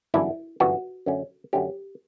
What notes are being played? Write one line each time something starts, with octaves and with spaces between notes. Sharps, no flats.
G1 F#2 E3 B3 D4 E4
G1 F#2 E3 B3 D4 F#4
F#2 D3 A3 C#4
F#2 D3 A3 C#4 G4